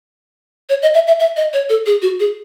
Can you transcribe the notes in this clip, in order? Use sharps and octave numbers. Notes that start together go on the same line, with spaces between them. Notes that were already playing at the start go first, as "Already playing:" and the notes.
C#5
D#5
E5
E5
E5
D#5
C#5
A4
G#4
F#4
G#4